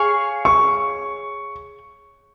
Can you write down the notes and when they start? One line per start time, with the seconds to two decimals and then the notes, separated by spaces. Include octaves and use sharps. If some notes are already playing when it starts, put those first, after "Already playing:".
Already playing: G#4 C#5 F5 C#6
0.45 C#6